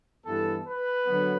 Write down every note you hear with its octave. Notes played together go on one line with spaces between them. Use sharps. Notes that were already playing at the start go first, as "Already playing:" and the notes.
G2 E3 B3 A4
B4
D3 F#3 B3